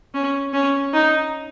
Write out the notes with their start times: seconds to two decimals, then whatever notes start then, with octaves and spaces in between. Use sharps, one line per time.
0.14 C#4
0.53 C#4
0.93 D#4